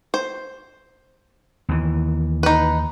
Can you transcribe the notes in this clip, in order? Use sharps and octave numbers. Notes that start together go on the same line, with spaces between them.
C5
D#2 E3
D#4 B4